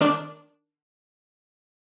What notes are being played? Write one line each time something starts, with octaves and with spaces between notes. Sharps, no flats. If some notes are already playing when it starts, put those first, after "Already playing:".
D#3 D4